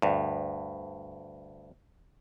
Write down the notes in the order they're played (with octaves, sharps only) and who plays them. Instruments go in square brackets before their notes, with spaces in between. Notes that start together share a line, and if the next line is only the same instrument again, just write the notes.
[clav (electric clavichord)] D2 G2